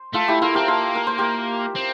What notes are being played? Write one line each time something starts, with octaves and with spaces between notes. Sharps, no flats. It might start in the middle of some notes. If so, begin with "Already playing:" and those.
Already playing: C5
A3 F4 A4
E4 G4
A#3 F4 A4
C4 G4 A#4
A#3 A4 C5
A#4
C5
G4 A#4
C4